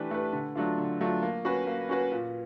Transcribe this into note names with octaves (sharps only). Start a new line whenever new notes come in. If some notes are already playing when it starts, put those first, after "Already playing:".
Already playing: E3 A3 D4 G4 B4
A3 D4 G4 B4
D3
F#3 A3 D4 F4
D3
F#3 A3 D4 F4
A#3
C#4 F#4 B4
A#3
C#4 F#4 B4
A#2